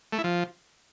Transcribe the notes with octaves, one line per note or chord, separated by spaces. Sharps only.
A3
E4
F3